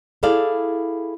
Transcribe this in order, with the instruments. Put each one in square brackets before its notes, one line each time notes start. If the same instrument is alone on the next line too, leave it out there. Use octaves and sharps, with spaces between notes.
[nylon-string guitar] E4 G#4 A4 D5 F5